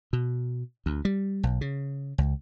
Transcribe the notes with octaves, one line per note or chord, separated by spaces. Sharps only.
B2
D2
G3
B1
C#3
C#2